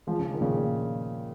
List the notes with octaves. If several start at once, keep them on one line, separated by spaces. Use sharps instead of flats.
F3 G#3
C#3 F3
D#3
A#2 C#3
A#2